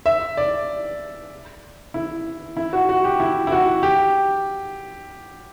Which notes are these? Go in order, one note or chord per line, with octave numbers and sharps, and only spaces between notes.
E5
D5
E4
E4
F#4
F#4
G4
E4
E4
F#4
G4